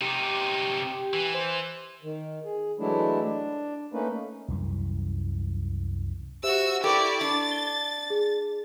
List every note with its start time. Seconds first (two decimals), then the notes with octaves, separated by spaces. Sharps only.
0.01 C3 D#4 G4
1.14 E3
1.34 C5
2.03 D#3
2.45 G#4
2.79 E3 F#3 G#3 A3 D4 E4
3.21 D4
3.93 A3 A#3 C#4 D#4 B4
4.48 C2 F#2 E3 G3
6.43 F#4 G4 C5 E5 E6
6.84 E4 G4 A4 A#4 D5 C#6
7.21 D4 A6
7.52 G7
8.10 G#4